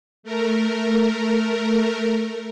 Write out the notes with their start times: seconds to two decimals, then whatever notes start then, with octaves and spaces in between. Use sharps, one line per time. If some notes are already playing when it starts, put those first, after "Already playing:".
0.23 A3 A#4